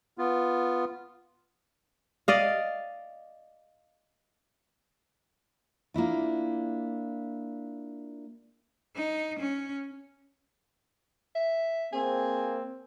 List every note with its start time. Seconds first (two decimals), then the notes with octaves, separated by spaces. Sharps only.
0.18 B3 F4
2.28 D5 D#5 F5
5.94 A#3 D4 E4 F4
8.95 D#4
9.39 C#4
11.35 E5
11.93 A#3 C4 G#4